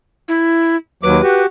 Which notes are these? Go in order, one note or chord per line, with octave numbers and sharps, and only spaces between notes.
E4
D#2 F#3 B4 D6
F#4 G4